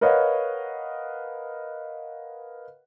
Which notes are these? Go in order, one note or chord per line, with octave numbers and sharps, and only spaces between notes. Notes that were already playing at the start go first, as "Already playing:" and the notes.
A#4 B4 C#5 D#5 F5 F#5